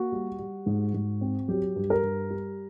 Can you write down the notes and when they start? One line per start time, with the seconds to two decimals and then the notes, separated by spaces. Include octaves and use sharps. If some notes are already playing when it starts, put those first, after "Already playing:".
Already playing: A#3 F#4
0.12 G3
0.39 G3
0.66 G#2
0.94 G#2
1.21 C4
1.48 F#3 G4
1.76 G2
1.90 A#4
2.03 G2
2.30 G3